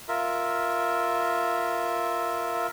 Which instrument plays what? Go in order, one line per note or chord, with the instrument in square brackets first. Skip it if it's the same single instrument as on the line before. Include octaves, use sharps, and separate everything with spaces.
[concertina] F4 A#4 E5